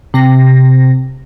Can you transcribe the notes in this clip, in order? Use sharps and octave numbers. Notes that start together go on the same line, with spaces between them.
C3 A#6